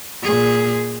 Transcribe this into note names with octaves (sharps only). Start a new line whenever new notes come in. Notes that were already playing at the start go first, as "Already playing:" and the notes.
A#2 G#4